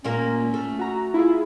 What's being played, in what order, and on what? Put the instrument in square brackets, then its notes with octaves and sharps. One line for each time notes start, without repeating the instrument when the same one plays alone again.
[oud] A#2 A#3 A#4 [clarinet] C#4
[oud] A3
[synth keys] F#4 A#5
E4 F4 G#4